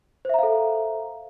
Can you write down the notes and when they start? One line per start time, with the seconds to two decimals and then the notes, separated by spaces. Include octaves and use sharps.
0.25 C5
0.29 E5
0.34 A#5
0.39 F5
0.43 A4